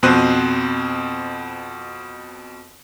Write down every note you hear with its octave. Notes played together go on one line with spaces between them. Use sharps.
F2 B2 C4 C6 F#6 D#7